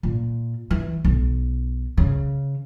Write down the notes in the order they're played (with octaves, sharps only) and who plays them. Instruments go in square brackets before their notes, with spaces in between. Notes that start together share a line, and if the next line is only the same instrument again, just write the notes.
[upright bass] A#2
E3
B1
C#3